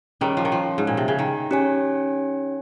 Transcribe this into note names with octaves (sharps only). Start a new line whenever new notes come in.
D#3 G3 C#4 G#4 C#5
F3
D#3
F3
G#2
A#2
C3
C#3
D#3
C#4 G4 C#5 G#5